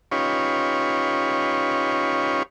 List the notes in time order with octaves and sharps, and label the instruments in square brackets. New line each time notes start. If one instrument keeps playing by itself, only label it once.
[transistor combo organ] C#4 D#4 F4 G4 B4 C#5